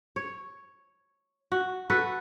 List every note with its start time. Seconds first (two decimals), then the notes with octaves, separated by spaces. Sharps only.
0.16 C#5
1.52 F#4
1.90 F#4 A4 B4